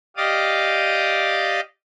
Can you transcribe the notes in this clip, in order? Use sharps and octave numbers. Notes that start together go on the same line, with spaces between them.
G4 D5 D#5 F5 D6 D#6